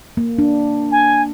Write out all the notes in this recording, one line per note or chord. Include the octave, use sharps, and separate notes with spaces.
A#3
D4
G#5